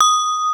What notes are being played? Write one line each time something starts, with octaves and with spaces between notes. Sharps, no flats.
D#6